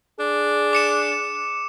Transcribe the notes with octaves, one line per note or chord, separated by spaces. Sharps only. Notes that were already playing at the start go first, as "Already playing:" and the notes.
D4 G#4
D6 C#7 E7